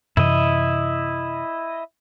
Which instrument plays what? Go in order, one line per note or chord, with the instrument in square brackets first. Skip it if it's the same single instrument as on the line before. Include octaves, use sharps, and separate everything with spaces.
[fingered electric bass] F#2 C3 E3 [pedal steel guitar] E4 D#5